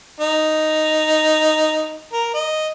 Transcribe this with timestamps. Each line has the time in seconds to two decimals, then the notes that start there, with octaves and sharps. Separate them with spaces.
0.21 D#4
2.13 A#4
2.34 D#5